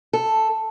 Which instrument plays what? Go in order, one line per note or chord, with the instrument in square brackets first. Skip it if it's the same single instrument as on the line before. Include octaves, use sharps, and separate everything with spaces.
[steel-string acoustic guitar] A4